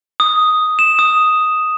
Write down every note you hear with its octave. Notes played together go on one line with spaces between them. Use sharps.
D#6
E7
D#6